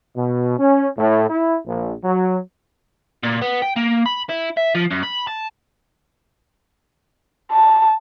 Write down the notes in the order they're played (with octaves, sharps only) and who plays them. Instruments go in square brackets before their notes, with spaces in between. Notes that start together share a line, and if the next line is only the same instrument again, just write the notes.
[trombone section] B2
C#4
A2
E4
A#1
F#3
[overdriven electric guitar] A#2
B3
G5
A#3
B5
E4
E5
F3
F#2
B5
A5
[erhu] A5